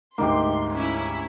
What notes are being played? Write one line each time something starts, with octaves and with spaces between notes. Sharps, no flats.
D2 G#2 A#3 D#4 G4 C6
C#4 E4